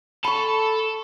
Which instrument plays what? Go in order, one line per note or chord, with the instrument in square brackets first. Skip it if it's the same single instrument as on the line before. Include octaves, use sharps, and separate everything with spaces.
[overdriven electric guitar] A4 [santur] B5 C#6